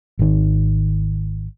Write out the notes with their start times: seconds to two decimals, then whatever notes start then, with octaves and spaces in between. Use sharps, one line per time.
0.19 G#1 D#3